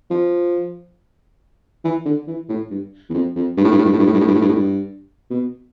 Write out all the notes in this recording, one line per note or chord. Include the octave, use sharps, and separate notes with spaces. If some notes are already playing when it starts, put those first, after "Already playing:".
F3
E3
D3
E3
A2
G2
E2
F2
F2
G2
A2
G2
A2
G2
A2
G2
A2
G2
A2
G2
A2
G2
A2
G2
B2